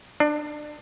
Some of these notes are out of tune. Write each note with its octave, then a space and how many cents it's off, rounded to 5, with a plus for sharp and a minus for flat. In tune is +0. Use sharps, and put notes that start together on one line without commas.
D4 +25